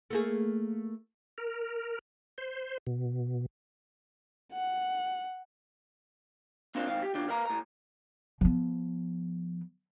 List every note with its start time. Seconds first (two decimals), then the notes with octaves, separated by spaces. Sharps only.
0.10 A3 A#3 G#4
1.38 A#4
2.38 C5
2.87 B2
4.53 F#5
6.75 C4 D4 F4 A#4 C5
6.87 C#2 D#3 C4 F5
7.02 G4
7.14 C#3 G3 D4 F4
7.28 A#4 B4 F5 A#5
7.46 A2 A#5
8.41 F3 B3